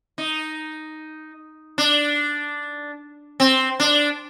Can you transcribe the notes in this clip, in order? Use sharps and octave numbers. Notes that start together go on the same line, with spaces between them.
D#4
D4
C4
D4